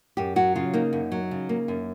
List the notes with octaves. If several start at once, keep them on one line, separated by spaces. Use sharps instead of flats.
F#2 G4
F#3 F#4
C#3 F4
A#3 D#4
F#2
F#3
C#3
A#3
F#2